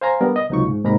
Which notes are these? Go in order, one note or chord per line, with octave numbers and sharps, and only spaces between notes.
C5 F5 G#5 A#5 C6
G3 B3 D4 A#4
D#5
C#2 C3 F#3 D#4 F4 C#6
G#2
D#2 G#2 C3 A#4 A#5 B5